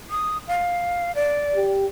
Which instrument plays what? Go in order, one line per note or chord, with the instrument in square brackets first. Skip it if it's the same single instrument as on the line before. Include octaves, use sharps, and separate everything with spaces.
[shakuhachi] D#6
F5
D5
[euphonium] G4